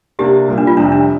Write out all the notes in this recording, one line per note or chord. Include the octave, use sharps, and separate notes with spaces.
C3 A#3 D4 G4
C2 A#2 A#3
D4
F4
F1 F2 C3 G3 D4
D4